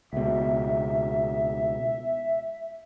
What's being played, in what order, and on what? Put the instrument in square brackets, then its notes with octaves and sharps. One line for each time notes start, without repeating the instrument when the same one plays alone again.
[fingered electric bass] C#2 B2 [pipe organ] E5